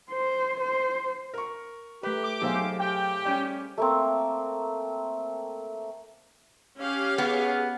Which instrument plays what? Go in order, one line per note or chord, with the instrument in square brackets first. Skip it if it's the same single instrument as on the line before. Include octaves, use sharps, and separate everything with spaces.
[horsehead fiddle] C5
C5
[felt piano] A#4 C#6
[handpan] A3 A#4 [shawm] G4 [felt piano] B4
[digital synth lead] D6
[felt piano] B1 E6 [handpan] G#4 C5 F5
[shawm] G4 [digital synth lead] G5
[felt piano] G3 C#4
[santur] A3 A#3 C4
[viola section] C#4 G4 F5
[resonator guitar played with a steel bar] B3 [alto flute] G#4